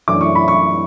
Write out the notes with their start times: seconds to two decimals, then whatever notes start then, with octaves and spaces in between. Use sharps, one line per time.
0.08 F#2 E3 A3 D4 D6
0.21 C#6
0.35 B5
0.48 C#6